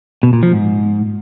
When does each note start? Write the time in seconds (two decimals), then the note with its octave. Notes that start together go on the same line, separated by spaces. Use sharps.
0.23 B2
0.33 A#2
0.43 F3
0.53 G#2